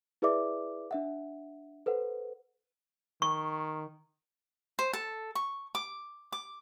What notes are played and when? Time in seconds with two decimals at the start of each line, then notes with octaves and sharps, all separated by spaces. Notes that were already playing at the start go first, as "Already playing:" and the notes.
0.22 E4 G#4 B4 D5 E5 D6
0.91 D4 E5 F#5
1.86 A4 B4 C5 F#5
3.22 D#3 C#6
4.79 C5
4.93 A4
5.35 C#6
5.75 D6
6.32 D6